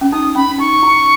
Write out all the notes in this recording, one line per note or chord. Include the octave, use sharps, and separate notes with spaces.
C#4
D#4 D#6
C#4 B5
D#4 C#6
E4